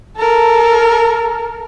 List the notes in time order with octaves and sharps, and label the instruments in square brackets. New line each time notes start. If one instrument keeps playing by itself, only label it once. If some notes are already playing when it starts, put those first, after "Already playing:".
[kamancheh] A4 A#4